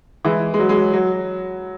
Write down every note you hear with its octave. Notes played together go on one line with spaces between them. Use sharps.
E3 G#3
G#3
F#3
G#3
F#3
F#3